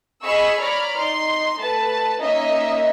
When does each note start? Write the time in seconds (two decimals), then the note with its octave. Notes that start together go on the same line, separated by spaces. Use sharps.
0.23 G#4 D#5 G#5 B5 C#6 E6
0.59 C#5 D5 A#5 B5 F6
0.97 D#4 C6
1.60 A3 B4 A5
2.21 A#3 C#4 D#4 D#5 E5